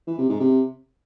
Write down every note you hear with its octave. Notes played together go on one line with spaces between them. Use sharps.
E3
C3
G#2
C3